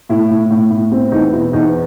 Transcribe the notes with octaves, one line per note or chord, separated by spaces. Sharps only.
A2 E4
A2
A2
A2
C4
E2 D#4
B2 E4
E2 D#4